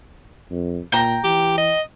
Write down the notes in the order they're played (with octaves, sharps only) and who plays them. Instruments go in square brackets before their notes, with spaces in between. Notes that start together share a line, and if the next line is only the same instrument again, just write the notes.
[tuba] F2
[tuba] A#2 [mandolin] G5 A#5
[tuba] E3 [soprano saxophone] G4
[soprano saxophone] D#5